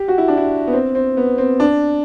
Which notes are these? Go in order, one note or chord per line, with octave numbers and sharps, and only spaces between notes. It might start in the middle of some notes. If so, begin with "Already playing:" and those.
Already playing: G4
F#4
E4
D4
E4
B3
C4
C4
B3
C4
D4